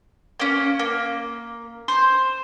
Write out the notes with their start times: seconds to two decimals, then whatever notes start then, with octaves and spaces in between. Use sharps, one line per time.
0.40 A#3 C#4
0.79 A#3
1.88 C5